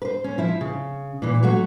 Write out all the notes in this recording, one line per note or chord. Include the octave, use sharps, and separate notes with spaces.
B4 C5
C#4
F3 E4
C#3
A#2 E3
F#3 A3 F#4